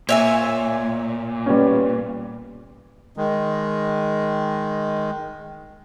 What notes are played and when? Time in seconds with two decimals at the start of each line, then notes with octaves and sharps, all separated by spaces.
0.09 A#2 C#5 E5 G#5
1.46 G3 B3 C#4
3.17 D#3 G#3